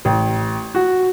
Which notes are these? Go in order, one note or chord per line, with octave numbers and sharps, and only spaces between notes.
A1
F#4